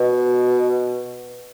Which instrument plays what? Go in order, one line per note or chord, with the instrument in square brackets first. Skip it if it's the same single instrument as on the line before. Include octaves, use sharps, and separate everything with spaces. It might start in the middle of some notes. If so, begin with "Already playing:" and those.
Already playing: [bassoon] B2